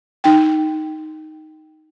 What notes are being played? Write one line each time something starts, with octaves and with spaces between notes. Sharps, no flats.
D#4 G5